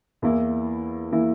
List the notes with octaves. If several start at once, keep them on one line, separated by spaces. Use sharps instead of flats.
E2 E3 A#3 E4
E3 A#3 E4